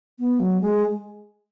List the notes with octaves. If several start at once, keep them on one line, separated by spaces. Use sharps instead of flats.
B3
F#3
G#3